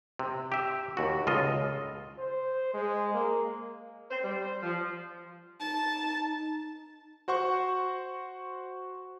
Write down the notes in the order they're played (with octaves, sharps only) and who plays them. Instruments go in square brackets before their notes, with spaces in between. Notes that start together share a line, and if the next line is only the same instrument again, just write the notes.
[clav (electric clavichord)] C3
G4 E5
D#2 F#4
C#2 F4 A4 D#5
[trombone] C5
G#3
A#3
[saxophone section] C5
G3
C5
F3
[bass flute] D#4 [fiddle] A5
[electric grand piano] F#4 C5 F#5 C#6